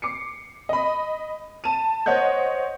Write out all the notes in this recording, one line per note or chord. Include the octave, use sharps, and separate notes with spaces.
D6 C7 C#7
D#5 B5
A5 D#7
C5 C#5 D#5 F#5 G6